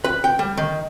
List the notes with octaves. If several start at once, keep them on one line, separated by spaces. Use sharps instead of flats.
B4
G5
G3
D#3